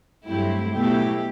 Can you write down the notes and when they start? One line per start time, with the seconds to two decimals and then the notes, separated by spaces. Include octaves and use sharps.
0.25 G2 F#3 A3 C4 E4 G4
0.72 B2 F#3 A3 E4 G4